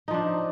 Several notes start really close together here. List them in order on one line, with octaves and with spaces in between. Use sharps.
D#4 F3 D4